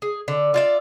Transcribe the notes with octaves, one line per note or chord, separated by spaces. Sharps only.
G#4
D3
F4 D5 E5